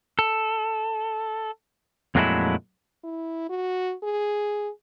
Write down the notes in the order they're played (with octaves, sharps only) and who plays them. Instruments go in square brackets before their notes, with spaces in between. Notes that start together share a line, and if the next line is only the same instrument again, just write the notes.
[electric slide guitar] A4
F2 A#2 F#3 G#3 A3 E4
[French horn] E4
F#4
G#4